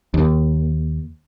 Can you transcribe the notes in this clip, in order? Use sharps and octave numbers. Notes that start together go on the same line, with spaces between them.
D#2